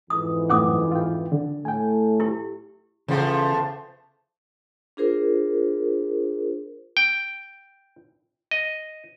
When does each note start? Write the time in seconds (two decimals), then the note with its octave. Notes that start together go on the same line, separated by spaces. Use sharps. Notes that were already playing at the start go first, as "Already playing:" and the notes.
0.10 F2 G#2 E3 D#6
0.50 F#2 A2 C#4 F#5 D6 D#6
0.92 F4 G5
1.32 D3
1.65 A2 A3 G5 G#5
2.20 E4 G4
3.08 E2 C#3 F3 A3
4.97 D4 F4 G#4 A#4 C5
6.97 G5
8.51 D#5